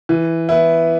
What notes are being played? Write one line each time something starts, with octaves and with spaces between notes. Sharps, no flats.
E3
B3 E4